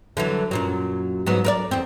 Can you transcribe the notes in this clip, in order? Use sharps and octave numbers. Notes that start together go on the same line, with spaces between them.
D3 E3 F#3
F#2 A#2 F#3
G#2 F#3 B3
A#4 B4 D5
E2 C4